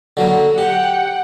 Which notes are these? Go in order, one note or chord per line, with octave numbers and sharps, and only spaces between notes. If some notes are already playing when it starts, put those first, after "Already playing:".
D3 F#3 A#3
G4 F#5 G5